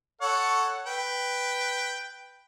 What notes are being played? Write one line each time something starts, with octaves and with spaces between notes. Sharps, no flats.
A4 C#5 F#5
B4 G5